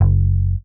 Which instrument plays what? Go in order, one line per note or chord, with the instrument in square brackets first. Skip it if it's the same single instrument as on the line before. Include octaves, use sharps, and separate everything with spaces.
[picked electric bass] F#1